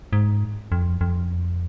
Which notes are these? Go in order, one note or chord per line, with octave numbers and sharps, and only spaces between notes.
G#2
F2
F2